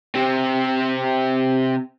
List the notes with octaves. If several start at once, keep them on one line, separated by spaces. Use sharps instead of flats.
C3 C4